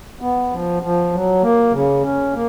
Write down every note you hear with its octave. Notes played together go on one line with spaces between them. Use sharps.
B3
F3
F3
F#3
A#3
C#3
C#4
A#3